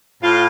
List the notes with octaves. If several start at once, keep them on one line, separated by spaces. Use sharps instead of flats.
A2 F4